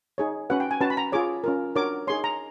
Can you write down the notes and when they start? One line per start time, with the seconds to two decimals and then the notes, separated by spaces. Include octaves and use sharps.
0.18 D#4 G#4 C#5
0.50 C#4 F#4 B4 F#5
0.60 G5
0.71 G#5
0.80 C#4 F#4 B4 A5
0.90 B5
0.97 A#5
1.12 F4 G#4 C#5 D6
1.44 C#4 F4 A#4
1.75 D4 F#4 A#4 C#5 D6
2.07 D#4 G#4 C#5 C6
2.24 A#5